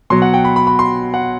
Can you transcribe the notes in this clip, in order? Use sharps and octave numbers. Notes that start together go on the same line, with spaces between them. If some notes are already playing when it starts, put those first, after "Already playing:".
B2 F#3 C6
F#5
G5
B5
B5
B5
C6
F#5